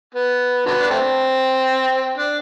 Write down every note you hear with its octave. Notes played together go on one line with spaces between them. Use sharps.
B3
D3 F#3 B3
D4
A3 C4
D4